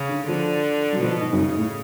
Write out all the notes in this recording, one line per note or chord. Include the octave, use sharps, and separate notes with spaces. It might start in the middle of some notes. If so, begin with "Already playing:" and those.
Already playing: C#3
D3
D3 F3
F#3
B2 F3
G#2
F#2
G#2 C#3
A2